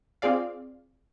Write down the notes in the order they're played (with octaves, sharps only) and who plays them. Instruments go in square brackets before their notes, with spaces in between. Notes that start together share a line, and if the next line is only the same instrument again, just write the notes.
[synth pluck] C4 F4 G#4 D5 F5